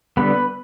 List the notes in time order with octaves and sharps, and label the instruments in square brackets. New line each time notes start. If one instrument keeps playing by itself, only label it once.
[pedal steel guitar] D3 G3 B3 B4